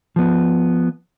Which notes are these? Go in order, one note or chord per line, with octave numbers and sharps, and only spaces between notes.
F3 B3